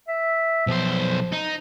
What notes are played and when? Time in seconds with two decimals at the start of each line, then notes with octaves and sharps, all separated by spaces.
0.08 E5
0.67 B1 F3 C5
1.32 D#4